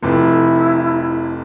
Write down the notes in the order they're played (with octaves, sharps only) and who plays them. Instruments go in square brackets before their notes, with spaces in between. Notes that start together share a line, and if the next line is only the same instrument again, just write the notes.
[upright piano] F1 F2 C3 [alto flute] E4